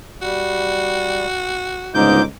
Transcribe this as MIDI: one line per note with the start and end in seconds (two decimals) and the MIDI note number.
0.22 1.26 55
0.22 1.95 66
1.94 2.23 31
1.94 2.23 37
1.94 2.22 44
1.94 2.23 63
1.94 2.25 86
1.94 2.22 91